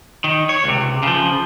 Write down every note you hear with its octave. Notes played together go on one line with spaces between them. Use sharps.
D#3
C#5
C#2 C3
C#3 F3